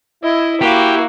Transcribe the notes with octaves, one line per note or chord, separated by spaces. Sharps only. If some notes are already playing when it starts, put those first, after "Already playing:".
E4 D#5
A#3 F#4 G4